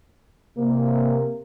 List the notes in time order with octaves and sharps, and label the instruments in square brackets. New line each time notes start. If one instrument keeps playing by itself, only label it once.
[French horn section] C3 A#3